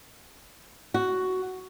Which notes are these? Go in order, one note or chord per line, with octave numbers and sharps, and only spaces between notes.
F#4